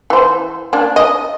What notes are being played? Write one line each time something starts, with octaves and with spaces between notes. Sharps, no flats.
E3 C5
A#3 D4
D#5